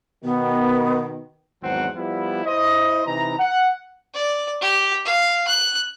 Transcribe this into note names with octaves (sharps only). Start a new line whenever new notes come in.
B2 D#3 B3
G#1 E2 F#3 C4 F#5
F3 G3 B3 E4
E4 C5 D#5
C3 E3 D#4 A#5
F#5
D5
G4
F5
F#6